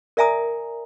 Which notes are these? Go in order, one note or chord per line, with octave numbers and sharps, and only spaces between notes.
A#4 D5 E5 G#5 A#5 D#6